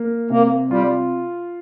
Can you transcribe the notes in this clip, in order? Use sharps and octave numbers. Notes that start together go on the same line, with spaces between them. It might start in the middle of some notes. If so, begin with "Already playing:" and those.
Already playing: A#3
C3 A#3
G3 F4